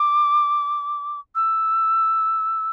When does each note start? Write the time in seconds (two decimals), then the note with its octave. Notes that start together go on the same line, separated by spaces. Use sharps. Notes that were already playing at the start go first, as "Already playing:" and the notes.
Already playing: D6
1.35 E6